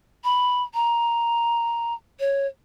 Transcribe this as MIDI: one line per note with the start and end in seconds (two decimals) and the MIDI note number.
0.24 0.63 83
0.74 1.94 82
2.20 2.47 73